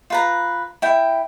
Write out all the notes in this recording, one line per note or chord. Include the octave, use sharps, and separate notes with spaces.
F4 B4 A#5
E4 G5